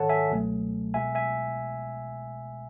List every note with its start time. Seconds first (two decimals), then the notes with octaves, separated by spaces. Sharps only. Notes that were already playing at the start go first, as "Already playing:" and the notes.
Already playing: A1 G#2 D#3 A4 C#5 F#5 A5
0.09 E5 G#5
0.30 C#2 B2 F#3 A3
0.94 B1 B2 G#3 E5 G#5
1.15 E5 G#5